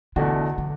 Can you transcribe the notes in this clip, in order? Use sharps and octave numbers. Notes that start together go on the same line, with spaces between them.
E2 B2 D3 A3 D4 F#4
D3